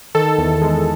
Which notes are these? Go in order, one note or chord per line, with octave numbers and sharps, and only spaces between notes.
D#3 A4
E2
G#3